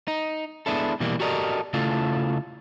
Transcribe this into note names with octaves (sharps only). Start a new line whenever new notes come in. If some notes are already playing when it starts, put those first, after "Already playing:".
D#4
G#3 A3 B3 D4 E4 A4
B2 E3 G3 A#3
F#4 G4 A4 A#4 D5 D#5
C#3 A3 E4 F4 A4